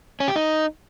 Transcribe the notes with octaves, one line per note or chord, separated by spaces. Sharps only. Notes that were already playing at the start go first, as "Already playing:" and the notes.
C#4
G4
D#4